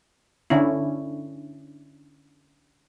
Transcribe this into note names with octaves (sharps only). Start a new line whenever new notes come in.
D3 C#4 D4 E4